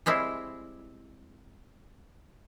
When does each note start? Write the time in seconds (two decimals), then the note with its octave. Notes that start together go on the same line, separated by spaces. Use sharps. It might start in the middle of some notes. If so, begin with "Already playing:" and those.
0.06 G3 G#3 C4 E4